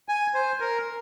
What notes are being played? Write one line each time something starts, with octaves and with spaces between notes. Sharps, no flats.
G#5
C5
A#4